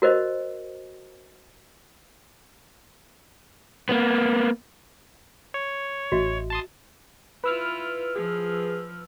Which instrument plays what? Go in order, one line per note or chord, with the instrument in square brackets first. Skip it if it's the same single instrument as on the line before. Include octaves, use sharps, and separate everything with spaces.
[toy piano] F#4 A#4 C5 D#5
[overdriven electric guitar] A#3 B3
[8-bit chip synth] C#5
[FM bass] A1 [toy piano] F#4 D#5 E5
[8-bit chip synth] A5 C6 D#6
[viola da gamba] E4 F4 [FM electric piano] B4 E6 F6
[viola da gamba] F3 [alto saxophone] G#4